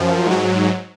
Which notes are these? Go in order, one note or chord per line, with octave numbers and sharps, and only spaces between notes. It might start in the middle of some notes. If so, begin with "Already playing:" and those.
Already playing: F#2 F3
G#2 F#3